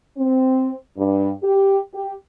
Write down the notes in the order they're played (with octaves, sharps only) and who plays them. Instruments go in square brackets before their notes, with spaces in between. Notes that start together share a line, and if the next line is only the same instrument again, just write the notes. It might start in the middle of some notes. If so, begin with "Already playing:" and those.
[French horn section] C4
G2
G4
G4